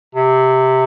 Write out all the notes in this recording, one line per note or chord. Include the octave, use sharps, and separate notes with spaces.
C3